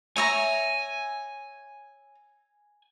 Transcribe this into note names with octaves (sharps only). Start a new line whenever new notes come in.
C#5 E5 G#5 A#5